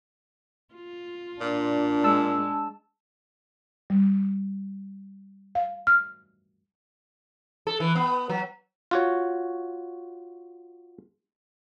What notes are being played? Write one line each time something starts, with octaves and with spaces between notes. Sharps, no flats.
F4
A#2 D4
G#3 A5 E6
G3
F5
F6
A4
E3
B3
F#3
F4 F#4 C#5